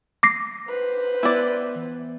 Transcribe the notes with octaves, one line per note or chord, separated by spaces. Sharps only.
D6 A#6 C7
B4 C5
B3 E4 D5 F#5 G5
E3